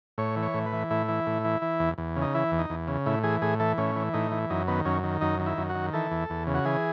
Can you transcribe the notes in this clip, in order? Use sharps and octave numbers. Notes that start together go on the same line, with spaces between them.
A2 C#5
E3
C#5
A2
B4
E3
A2 E4
E3
A2
E3
E3
E2
E2
C#3
D#4
E3 E4
E2
D#4
E2
C#3
A2 E4
E3 G#4
A2 G#4
E3 A4
A2 C#4
E3
A2 D#4
E3
F#2 D#4
D#3 B3
F#2 C#4
D#3
F#2 D#4
D#3
E4
F#2
F#4
D#3
E3 A4
E2
E2
C#3
F#4
E3 G#4